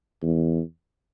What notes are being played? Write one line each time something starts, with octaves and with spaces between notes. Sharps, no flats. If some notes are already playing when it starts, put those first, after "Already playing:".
E2